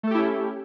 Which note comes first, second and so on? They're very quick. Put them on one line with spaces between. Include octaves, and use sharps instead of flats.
A3 A4 G4 E4 C#4